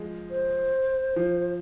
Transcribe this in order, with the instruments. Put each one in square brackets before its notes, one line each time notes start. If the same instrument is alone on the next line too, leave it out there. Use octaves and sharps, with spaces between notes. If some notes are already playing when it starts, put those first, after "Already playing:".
Already playing: [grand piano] F3 G#3
[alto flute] C5
[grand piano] F3